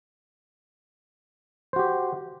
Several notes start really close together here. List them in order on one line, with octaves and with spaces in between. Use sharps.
C5 F#4 G4